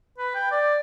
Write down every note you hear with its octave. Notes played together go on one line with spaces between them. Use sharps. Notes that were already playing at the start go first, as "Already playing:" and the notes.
B4
G5
D5